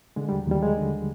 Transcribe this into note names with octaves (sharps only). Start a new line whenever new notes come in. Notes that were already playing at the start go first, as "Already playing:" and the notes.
D3 G#3
D#2 G3
F#3
D#2 G3
F3 G#3
D3